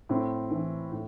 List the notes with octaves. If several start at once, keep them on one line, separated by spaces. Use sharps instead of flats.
A2 C4
E3
A2